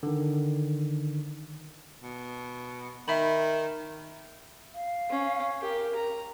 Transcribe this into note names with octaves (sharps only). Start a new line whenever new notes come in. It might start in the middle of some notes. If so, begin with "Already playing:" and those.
D3 D#3
B2
D#3 E5 B5
F5
C#4
G4 A#4
A#5